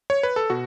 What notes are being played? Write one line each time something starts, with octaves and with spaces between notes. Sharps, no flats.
C#5
B4
A4
B2 F#4